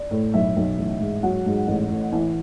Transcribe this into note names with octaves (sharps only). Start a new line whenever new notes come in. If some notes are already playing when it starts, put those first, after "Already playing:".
Already playing: D5
A2
B1 E5
B1
A1
G#2
F#3 F#5
G#2
A1
A2
E3